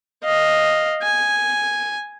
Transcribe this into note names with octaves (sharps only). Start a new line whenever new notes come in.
D#5 F5
G#5